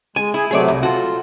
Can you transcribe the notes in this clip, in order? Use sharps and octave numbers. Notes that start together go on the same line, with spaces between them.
G#3 G#5
E4 G#4
C3 F#3 A3 G#4 C#5 D5
C2
F4 F#4 A4